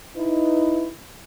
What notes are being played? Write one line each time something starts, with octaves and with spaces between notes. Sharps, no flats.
D#4 E4 B4